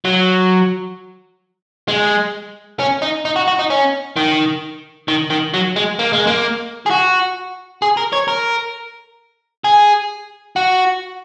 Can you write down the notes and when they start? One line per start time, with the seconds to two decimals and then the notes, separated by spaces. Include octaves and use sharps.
0.05 F#3
1.88 G#3
2.79 C#4
3.02 D#4
3.25 D#4
3.36 F#4
3.48 F#4
3.59 D#4
3.70 C#4
4.16 D#3
5.08 D#3
5.30 D#3
5.54 F#3
5.76 G#3
5.99 A#3
6.13 G#3
6.27 A#3
6.86 G#4
6.90 F#4
7.82 G#4
7.97 A#4
8.13 C#5
8.28 A#4
9.64 G#4
10.56 F#4